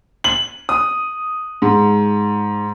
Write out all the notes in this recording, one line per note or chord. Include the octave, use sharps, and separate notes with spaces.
F#7
D#6
G#2